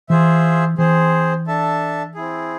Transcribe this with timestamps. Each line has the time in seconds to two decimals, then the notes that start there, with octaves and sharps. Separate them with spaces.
0.09 E3 F4 G#4 C5 E5
0.78 E3 C4 G#4 C5
1.47 D4 A4 E5 A5
2.15 C4 E4 G#4